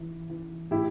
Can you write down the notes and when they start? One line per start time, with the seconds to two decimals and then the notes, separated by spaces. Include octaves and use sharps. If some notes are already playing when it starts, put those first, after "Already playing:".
Already playing: E3
0.30 E3
0.71 A2 E4 G4